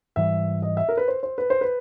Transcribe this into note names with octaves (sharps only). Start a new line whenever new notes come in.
G#2 E3 G3 E5
D#5
E5
A#4
B4
C5
C5
B4
C5
B4